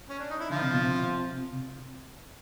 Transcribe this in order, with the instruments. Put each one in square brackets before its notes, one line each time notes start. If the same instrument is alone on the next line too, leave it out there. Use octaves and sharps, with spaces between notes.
[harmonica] C#4
D4
D#4
E4
[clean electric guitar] D3 [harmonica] F3 F4
[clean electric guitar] C3
B2
C3